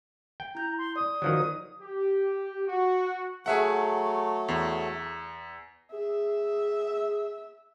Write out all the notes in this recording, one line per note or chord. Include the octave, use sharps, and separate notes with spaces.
G5
E4 A#5 G6
C6
D5 D#6
D#3 F3 F#3
G4
F#4
F#3 A3 G#4 E5 F#5
E2
G#4 E5